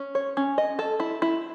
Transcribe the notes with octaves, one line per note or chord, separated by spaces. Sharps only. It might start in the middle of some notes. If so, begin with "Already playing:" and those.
Already playing: C#4
C#5
C#4
D#5
A4
E4
E4